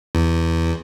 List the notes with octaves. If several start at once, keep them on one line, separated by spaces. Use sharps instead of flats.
E2